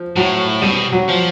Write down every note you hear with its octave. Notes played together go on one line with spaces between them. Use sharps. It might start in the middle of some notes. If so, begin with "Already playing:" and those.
Already playing: F3
A2 F#3
B2 G3
F#3
F3